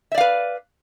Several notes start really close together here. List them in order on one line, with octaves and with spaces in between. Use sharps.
E5 D5 F5 B4